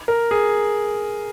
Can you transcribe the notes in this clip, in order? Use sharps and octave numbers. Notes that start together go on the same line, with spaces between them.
A#4
G#4